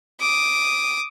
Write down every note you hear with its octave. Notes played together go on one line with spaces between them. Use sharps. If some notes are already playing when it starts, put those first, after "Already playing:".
D6 D#6